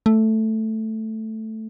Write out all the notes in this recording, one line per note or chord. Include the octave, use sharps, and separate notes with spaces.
A3